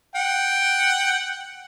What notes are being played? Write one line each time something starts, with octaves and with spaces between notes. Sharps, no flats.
F#5 G5